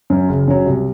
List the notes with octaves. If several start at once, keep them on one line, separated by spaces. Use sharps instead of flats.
F#2 F#3
F#1
F#2 F#3
C2